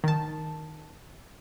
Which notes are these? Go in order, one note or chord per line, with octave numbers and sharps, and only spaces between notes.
D#3 A5